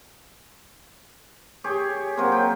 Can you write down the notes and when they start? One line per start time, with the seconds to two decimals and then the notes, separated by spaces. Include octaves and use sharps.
1.64 G4 G#4 C#5
2.17 F#3 A#3 C4
2.32 G5